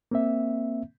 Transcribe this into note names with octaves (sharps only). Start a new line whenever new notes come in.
A#3 C4 E5